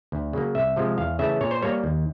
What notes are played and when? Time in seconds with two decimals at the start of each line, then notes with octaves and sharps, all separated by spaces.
0.12 D2
0.33 C#3 F#3 A#3
0.55 C2 E5
0.76 C3 F3 G#3
0.98 E2 F5
1.19 C#3 E3 A3 E5
1.41 A#2 C#5
1.51 C5
1.62 G3 A#3 C#5
1.84 D#2